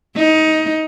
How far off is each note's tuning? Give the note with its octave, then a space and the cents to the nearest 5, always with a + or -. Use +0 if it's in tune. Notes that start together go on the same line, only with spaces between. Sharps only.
D#4 +20